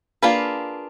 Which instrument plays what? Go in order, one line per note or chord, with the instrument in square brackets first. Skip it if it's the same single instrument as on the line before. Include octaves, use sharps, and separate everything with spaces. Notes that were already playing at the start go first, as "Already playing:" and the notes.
[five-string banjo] A#3 D4 F4 G#4 B4